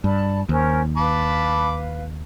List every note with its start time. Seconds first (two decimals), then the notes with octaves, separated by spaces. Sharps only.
0.04 G2 D5 A5 B5
0.49 D#2 C#4 A#4 C5
0.97 B4 F5 A5 B5 D6